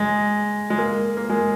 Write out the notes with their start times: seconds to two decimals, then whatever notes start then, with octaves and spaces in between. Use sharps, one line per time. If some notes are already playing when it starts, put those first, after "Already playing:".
Already playing: G#3
0.70 G#3
0.78 A#3
1.17 A#3
1.30 G#3